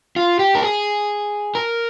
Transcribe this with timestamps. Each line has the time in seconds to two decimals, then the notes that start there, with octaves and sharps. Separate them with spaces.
0.16 F4
0.39 G4
0.55 A#4
0.62 G#4
1.55 A#4